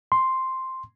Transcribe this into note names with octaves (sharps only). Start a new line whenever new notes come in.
C6